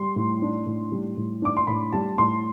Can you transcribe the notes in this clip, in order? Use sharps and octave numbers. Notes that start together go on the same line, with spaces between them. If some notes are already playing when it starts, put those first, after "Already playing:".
Already playing: G3 C6
A2
D4
A2
G3
A2
D4 D6
C6
A2 B5
G3 A5
A2 C6